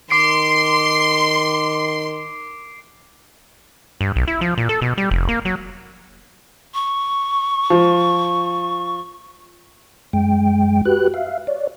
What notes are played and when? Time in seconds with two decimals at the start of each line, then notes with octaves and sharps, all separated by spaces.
0.10 D#3 C6 D6 C7 D7
4.01 G2
4.16 B1
4.28 E4
4.41 F3
4.58 A#2
4.69 A4
4.82 B2
4.98 G3
5.11 F1
5.29 A#3
5.45 F#3
6.74 C#6
7.70 F3
10.13 F#2 G#3 G5
10.85 F#4 G4 B4 F#6
11.14 E5 F5
11.47 C#5 D5